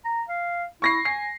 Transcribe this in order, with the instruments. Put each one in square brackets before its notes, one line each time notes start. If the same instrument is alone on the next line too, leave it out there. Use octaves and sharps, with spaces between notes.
[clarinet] A#5
F5
[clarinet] E4 [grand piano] C#6 A#6 C7
[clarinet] G#5 [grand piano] C7